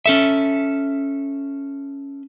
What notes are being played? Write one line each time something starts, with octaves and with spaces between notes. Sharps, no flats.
C#4 A4 E5